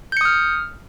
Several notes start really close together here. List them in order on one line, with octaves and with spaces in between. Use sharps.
G6 C#7 D#6 F6